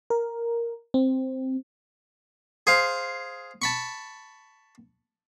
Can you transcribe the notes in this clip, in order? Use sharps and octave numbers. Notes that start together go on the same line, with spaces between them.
A#4
C4
G#4 C5 F5
A5 B5 C#6